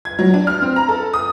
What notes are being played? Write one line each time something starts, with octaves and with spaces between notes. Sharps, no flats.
G#6
F#3
D4
F6
C4
A#5
A4
D#6